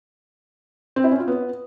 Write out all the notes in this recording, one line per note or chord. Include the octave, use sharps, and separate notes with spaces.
C4
E4
C#4
F4
B3